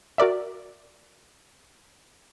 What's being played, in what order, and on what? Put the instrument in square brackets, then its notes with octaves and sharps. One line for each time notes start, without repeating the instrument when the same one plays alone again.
[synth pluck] F#4 A#4 D5 E5